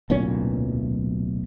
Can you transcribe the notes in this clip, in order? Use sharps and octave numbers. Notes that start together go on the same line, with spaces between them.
D1 B1 A#2 C#4